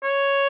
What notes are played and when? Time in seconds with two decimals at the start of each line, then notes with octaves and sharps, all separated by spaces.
0.03 C#5